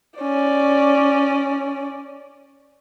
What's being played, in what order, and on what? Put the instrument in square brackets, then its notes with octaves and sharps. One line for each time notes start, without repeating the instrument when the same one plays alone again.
[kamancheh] C#4 D5